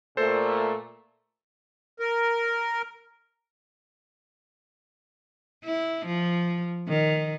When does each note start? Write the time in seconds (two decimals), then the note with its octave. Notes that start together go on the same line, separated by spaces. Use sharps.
0.17 A#2 A3 A4 C5
2.00 A#4
5.64 E4
6.06 F3
6.88 D#3